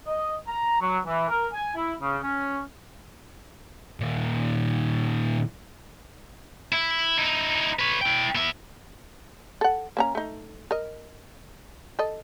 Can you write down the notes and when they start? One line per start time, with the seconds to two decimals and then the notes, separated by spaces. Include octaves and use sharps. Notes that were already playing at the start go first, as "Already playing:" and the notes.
0.07 D#5
0.48 A#5
0.80 F#3
1.06 E3
1.29 A#4
1.52 G#5
1.75 E4
2.00 C#3
2.22 C#4
4.00 A#2 D#3
6.72 E4
7.18 D#4 E4
7.79 B4 C#5
8.01 E4 G5
8.35 B3 E5
9.61 A4 F#5
9.97 A#3 C#4 A#5
10.15 A3 D#4
10.71 A#4 D#5
11.99 A4 D#5